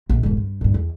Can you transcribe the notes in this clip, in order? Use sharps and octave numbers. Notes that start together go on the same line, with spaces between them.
A#1 F#2
E1 G#2
G2
G2 A#2
E2